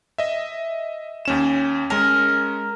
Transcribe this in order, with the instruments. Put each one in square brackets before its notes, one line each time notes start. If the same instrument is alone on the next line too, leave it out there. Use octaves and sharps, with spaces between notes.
[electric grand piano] D#5 E5
D#2 C#4 E7
[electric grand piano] G#3 C#4 [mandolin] A#4